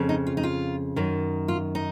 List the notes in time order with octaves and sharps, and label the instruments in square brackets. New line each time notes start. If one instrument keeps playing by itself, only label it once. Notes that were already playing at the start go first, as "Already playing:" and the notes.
Already playing: [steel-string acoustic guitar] F2 C#3
D#4
F4
D#4
F4
F#2 D#3
F4
D#4